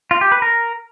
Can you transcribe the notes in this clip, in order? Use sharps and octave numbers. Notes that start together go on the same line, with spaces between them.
F4
G4
B4
A#4